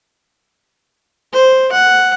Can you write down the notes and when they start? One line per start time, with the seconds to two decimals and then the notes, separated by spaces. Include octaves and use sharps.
1.33 C5
1.72 F#5